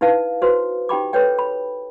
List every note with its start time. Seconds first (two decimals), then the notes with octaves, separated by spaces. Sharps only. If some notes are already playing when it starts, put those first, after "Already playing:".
0.01 D#4 E4 B4 F5 A5
0.42 F#4 B4 C5
0.89 D#4 G4 G5 B5 D6
1.13 A4 B4 C#5 G5
1.39 B5